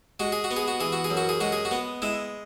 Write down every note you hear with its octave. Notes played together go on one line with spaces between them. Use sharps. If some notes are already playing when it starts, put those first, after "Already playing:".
G#3 F#4
G#4
F#4
B3
G#4
F#4
E3 G#4
F#4
G#4
F#2
F#4
G#4
G#3 F#4
G#4
F#4
B3
G#3 E4